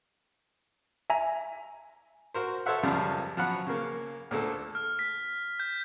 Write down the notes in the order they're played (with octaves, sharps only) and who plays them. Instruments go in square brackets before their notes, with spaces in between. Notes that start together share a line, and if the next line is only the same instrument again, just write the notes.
[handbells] E5 G#5 A#5
[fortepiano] F#4 A#4 C5
A4 C5 C#5 E5 F#5
C#2 F#2 C#3 F3 G3
F3 F#3 F#5 B5
C#3 A#3
D2 A#2 A3 A4
[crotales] F6
B6
G6